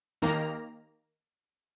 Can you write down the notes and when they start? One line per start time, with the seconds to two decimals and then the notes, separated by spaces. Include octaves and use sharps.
0.22 D#2 D#3 A#3 A#5